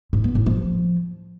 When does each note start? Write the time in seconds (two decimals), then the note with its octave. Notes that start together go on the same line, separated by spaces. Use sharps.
0.13 G#2
0.24 B3
0.35 A2
0.46 F3